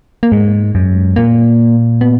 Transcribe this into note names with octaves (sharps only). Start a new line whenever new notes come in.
A#3
G#2 G#3
F#2
A#2 A#3
B3